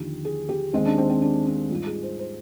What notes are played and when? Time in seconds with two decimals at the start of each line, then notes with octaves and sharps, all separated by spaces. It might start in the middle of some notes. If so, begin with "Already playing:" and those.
Already playing: D#2 D3 F3 G4
0.25 G#4
0.49 G4
0.73 D#2 D#3 G#3 C4
0.85 D4
0.98 C4
1.09 C4
1.22 D4
1.47 D4
1.70 G#2 G3 F4
1.86 G#4
2.03 C5
2.19 C5